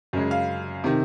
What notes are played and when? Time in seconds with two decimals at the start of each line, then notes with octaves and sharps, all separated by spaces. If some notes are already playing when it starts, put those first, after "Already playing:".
0.13 F#2 C#3 G#3
0.31 F5
0.84 C3 D#3